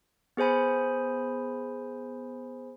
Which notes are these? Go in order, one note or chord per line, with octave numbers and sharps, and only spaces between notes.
B3 G#4 C5 G#5 B5